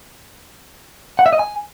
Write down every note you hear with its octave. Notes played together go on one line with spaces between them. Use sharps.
F#5
E5
D#5
G#5